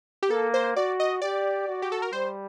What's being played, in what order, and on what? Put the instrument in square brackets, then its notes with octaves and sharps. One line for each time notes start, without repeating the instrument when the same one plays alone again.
[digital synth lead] G4
[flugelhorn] A#3 [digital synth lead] A4
[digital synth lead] C5
[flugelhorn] F#4 [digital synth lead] D5
[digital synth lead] D#5
[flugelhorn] G4 [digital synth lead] D5
[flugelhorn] F#4
[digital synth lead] G4
A4
A#4
[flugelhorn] G3 [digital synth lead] C5